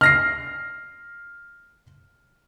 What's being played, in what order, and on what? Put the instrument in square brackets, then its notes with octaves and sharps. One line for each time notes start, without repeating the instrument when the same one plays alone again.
[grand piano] F6 A#6 C7